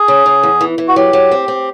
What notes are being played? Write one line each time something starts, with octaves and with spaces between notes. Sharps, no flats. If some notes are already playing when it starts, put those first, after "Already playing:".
Already playing: G#4
C#3
C#3
E2
E3
E3
F#4
F#3 G4
F#3
C4
C4